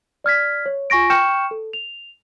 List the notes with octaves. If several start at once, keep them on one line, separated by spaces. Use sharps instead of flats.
D5 F6 G#6 B6
C#5
F4 G#5 C#6 A#6 D7
G5 C#6 F6 G6 C#7 E7
A4
F7